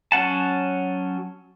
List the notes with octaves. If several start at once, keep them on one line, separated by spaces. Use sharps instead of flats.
F#3 C#4 F#5 A5